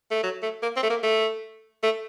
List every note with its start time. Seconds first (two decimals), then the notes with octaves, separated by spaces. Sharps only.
0.11 A3
0.23 F#3
0.42 A3
0.63 A#3
0.76 C4
0.83 A3
0.90 A#3
1.03 A3
1.83 A3